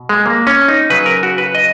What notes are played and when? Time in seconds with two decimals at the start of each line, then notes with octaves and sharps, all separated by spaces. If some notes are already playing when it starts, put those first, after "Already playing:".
Already playing: B2
0.09 G#3
0.26 A#3
0.47 C#4
0.68 D#4
0.90 C#3 F#3 B4
1.06 A#4
1.23 F#4
1.38 B4
1.55 D#5